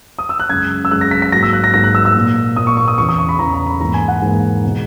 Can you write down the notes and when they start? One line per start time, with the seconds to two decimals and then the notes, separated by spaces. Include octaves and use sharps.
0.19 D#6
0.29 E6
0.40 F#6
0.50 F#2 C#3 G#3 G#6
0.85 E6
0.91 F#2 C#3 G#3 F#6
1.01 A#6
1.11 B6
1.22 B6
1.32 G#2 F#3 A#3 A#6
1.43 E6
1.53 F#6
1.64 A#6
1.74 G#2 F#3 A#3 A#6
1.84 F#6
1.95 E6
2.05 E6
2.15 A#2 A#3
2.56 A#2 A#3 D#6
2.67 C#6
2.77 C#6
2.88 D#6
2.98 E2 C#3 E3 C#6
3.09 D#6
3.19 C#6
3.29 B5
3.39 E2 C#3 E3 A#5
3.54 A#5
3.67 B5
3.80 G#2 E3 A#3 A#5
3.94 G#5
4.08 F#5
4.22 G#2 E3 A#3
4.65 B2 G#3